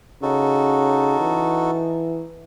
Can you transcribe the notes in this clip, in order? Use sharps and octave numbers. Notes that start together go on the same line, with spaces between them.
C#3 D#4 F#4 A4
E3